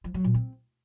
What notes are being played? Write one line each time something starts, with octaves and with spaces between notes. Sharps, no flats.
F3
F#3
A#2
C4